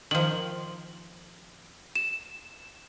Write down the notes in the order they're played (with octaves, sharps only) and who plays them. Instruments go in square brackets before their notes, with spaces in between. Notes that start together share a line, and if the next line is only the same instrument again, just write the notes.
[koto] D#3 F3 [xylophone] F#7
[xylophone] E7